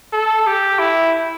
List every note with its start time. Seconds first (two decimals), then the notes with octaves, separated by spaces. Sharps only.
0.13 A4
0.46 G4
0.79 E4